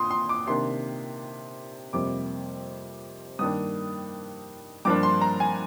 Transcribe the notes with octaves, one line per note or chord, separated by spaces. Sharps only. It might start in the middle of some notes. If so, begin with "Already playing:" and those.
Already playing: A#2 C6 D#6
C6
D6
C3 D#3 A#3 D4 C6
F2 C3 G3 A#3 D6
G2 D#3 A#3 D4 D#6
G2 F3 A#3 D4 D6
C6
A#5
G#5